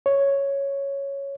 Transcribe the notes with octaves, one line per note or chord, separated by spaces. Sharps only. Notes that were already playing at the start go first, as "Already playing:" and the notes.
C#5